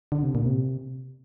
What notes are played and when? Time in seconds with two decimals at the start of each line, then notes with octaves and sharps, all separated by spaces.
0.12 D3
0.23 C3
0.35 A#2
0.46 C3